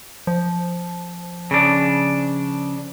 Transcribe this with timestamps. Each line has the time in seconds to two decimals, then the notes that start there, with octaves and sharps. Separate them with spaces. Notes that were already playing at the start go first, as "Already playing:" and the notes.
0.27 F3
1.51 C#3 D4